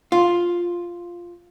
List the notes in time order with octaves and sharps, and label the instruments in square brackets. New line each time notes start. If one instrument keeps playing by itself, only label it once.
[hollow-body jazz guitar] F4